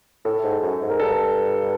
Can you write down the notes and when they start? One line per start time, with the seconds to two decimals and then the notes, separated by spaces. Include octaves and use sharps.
0.25 A2 A4
0.43 G#2
0.63 F#2
0.81 G#2
0.90 A#4
1.00 G2 A4